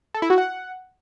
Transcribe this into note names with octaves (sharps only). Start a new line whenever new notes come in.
A4
E4
F#4
F#5